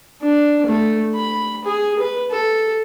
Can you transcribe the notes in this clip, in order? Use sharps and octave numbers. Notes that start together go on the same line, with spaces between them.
D4
A3
B5
G#4
B4
A4